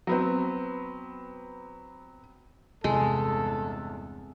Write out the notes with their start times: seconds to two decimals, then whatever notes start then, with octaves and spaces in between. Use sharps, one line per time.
0.07 F#3 B3 C4
2.84 G1 E2 C3 G#3 A4